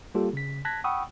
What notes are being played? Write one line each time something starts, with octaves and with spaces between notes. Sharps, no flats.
G3 A#3 F4 G4 A4
C#3 B6
A5 F#6 G#6 A#6 B6
F#5 G5 B5 C#6 D#6 E6